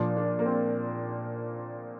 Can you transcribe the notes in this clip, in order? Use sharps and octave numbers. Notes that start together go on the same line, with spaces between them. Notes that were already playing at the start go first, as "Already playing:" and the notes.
Already playing: A#2 F3 D4
D4
A#3
C4